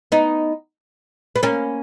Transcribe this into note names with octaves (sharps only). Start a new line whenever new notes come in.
B3 D#4
B3
A#3 C#4